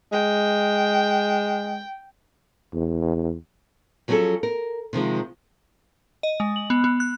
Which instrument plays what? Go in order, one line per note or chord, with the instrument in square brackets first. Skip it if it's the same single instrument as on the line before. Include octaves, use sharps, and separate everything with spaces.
[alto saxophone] G#3 [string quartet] G5
[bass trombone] E2
[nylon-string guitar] F3 F#3 B3 C#4 G#4 A4
A#4
C3 D#3 F3 G#3
[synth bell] D#5
G#3
F#7
B3
B3
F#6